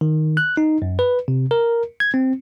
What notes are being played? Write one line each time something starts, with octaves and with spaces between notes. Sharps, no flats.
D#3
F#6
D#4
F#2
B4
C3
A#4
G#6
C4